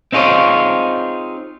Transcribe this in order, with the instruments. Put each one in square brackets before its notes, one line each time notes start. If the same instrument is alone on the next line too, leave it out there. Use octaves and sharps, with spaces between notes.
[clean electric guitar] C4 D#4 F4 G#4 C#5